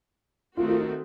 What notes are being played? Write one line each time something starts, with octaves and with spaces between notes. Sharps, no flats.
D#3 A3 C4 F4 F#4
F4
D#4